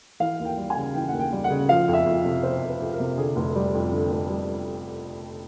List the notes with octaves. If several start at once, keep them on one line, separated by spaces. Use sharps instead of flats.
E3 F5
D#2
G5
G3
G#5
C#3
E3 G5
D#2 F#5
G5
G3
F#5
C#3
F3 F5
F2
E5
F2
C3
F3 C5
F2
B4
F2
A#4
C3
D3 G#4
F1
G3
F2
D3
F1
G3